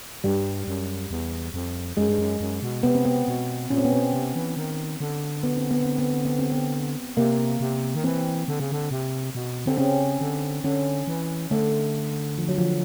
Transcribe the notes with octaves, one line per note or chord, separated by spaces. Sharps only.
G2 G3
F#2
E2
F2
F#2 G#3
G2
F#2
F#2
B2
C3 B3
C4
B3
B2
A#2 C#4
C4
B3
B2 C4
C3
E3
D#3
D3
B3
C4
B3
C4
B3
C4
B3
C4
B3
C3 A#3
C3
D#3
E3 C4
D3
C#3
D3
C3
B2
D3 C4
C#3 C#4
D3
D3 C#4
E3
D3 A3
F3
F#3
F3